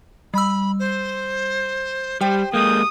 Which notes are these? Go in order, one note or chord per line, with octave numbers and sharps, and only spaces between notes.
G3 B5 E6
C5
G3 G4 C5 G5
G#3 A#3 D#6 G6